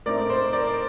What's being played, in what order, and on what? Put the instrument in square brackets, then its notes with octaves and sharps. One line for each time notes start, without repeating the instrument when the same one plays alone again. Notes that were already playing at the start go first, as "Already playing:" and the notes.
[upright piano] A2 A3 C4 D#4 A#4 D5
C5
A#4 D5